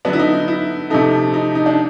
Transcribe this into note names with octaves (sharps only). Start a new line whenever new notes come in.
D3 F#3 B3 D4
E4
D#4
D#4
E4
C3 F3 A3 D#4
D#4
D#4
D4